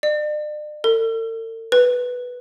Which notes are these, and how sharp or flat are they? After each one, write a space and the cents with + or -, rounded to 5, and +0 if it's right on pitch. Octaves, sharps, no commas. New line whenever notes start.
D5 +40
A4 +45
B4 +0